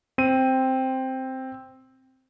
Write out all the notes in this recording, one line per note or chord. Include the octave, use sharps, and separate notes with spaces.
C4 D#7